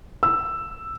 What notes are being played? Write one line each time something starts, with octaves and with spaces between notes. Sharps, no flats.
E6